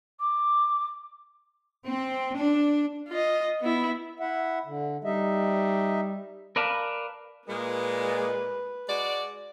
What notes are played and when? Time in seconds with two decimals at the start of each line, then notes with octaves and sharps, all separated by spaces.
0.20 D6
1.86 C4
2.36 D4
3.08 F4 D#5
3.61 B3 E4
4.20 E4 E5 F#5
4.65 D3
5.04 G3 D#4 D#5 E5
6.56 A#4 B4 D5 F5 A5
7.48 A#2 G#3 B4
8.89 G#3 F#4 D5